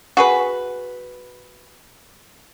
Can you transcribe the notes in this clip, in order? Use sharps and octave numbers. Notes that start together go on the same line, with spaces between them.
F#4 G#4 B4